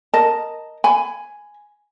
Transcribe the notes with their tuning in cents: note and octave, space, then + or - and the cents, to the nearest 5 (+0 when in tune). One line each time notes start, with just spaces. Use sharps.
A#4 +0 D#5 +0 A5 +0
G#5 +0 B5 +25